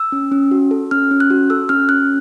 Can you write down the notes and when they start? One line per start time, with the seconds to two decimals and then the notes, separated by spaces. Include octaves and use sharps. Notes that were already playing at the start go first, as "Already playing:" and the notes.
Already playing: E6
0.12 C#4
0.32 C#4
0.51 F#4
0.71 A4
0.91 C#4 F6
1.11 C#4
1.20 F#6
1.30 F#4
1.50 A4 E6
1.69 C#4 F6
1.89 C#4 F#6